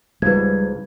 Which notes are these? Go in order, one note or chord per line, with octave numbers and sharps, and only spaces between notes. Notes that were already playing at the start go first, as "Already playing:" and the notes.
C#2 G#2 F3 G3 B4 G#6